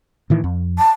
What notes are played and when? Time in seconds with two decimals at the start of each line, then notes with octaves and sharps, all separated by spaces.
0.30 A2 D#3 E3
0.44 F2
0.78 A5